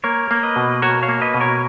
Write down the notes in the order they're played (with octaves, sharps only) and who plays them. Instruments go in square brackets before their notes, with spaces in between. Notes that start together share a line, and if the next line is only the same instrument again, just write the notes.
[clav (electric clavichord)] A#3 [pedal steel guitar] A#4 C#5
[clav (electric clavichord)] A#3
[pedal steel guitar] B4 D#5
[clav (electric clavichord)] B2
[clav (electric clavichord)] F#4 [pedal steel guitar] A#4 C#5
[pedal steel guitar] C#5 F5
[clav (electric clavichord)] A#3
[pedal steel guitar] B4 D#5
[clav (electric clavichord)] B2
[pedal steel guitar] A#4 C#5